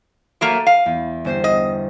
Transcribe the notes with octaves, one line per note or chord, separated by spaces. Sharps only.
F#3 A3 A#3 D7 D#7
F5
E2
G1 C5 C7
D#5